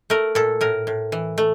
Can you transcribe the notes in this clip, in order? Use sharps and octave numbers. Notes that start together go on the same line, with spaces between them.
A3 A#4
A#2 A4
A2 A#4
A2
E3
A3